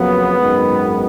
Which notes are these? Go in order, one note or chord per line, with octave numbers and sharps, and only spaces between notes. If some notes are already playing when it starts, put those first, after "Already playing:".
Already playing: F2 C#3 F#3 A#3 B3
G#1 F#2 D#3 G#3